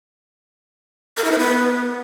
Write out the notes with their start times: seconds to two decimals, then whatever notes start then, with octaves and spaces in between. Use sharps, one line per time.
1.17 A#4
1.24 E4
1.32 C5
1.39 B3